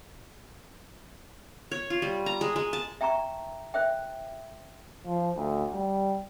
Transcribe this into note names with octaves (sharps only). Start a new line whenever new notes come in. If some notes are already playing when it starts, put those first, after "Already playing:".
C#5
F4
G3
A#5
G#3
G#3
A5
E5 G5 A5 A#5 C#6
C5 E5 G5
F3
D2
G3